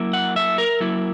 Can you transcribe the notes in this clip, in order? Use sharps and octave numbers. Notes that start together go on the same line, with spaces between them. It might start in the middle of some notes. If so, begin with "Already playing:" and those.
Already playing: F#3 A#3 E4
F#5
E5
A#4
F#3 A#3 E4